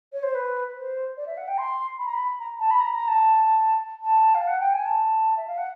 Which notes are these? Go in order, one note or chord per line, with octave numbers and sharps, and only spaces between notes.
C#5
C5
B4
C5
D5
E5
F#5
G5
C6
B5
A#5
B5
A#5
A5
B5
A#5
A#5
A5
A5
F5
F#5
G5
G#5
A5
E5
F5
F#5